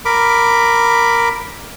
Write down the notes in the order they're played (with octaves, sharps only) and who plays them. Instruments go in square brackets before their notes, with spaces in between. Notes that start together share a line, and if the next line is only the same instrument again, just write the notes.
[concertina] A#4 B5 D6